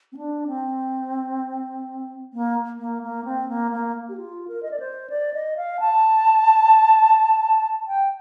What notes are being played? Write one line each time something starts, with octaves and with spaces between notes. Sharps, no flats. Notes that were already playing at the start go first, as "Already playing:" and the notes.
C4
D4
C4
A#3
A#3
A#3
C4
A#3
A#3
G4
F4
A#4
D#5
D5
C5
D5
D#5
F5
A5
G5